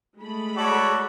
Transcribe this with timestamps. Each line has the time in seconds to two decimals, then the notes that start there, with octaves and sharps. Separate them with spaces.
0.21 G#3 A3 B5
0.57 F#4 A4 C#5 D5